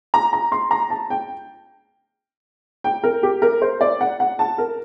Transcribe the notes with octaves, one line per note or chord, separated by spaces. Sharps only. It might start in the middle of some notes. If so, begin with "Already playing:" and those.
A#5
A#5
C6
A#5
A5
G5
G5
A#4
G4
A#4
C5
D5
F#5
F#5
A5
A#4